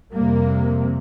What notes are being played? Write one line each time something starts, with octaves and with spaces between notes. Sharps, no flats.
F2 C3 G3 A#3